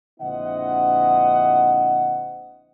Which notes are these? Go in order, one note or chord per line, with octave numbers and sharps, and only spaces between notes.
A#1 D3 C4 E4 D#5 F#5